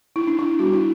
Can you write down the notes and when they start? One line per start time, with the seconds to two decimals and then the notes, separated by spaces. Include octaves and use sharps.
0.16 E4
0.27 D4
0.39 E4
0.59 G3 B3 D4 F#4
0.73 E4